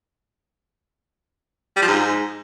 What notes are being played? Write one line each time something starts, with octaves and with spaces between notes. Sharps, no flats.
G3
F3
G#2